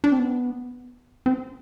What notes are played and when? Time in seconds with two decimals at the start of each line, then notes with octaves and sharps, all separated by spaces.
0.04 D4
0.12 C4
0.19 B3
1.26 C4